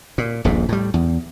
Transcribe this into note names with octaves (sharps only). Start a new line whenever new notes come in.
A#2
D#1 A#1 D#2 G#2
A2 G3
E2